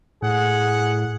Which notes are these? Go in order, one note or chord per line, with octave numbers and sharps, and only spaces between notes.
A2 G#4 F#5